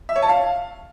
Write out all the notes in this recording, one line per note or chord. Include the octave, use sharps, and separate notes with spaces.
E5
C#5
A5
F5